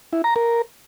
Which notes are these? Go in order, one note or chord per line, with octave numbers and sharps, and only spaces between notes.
E4
A#5
A#4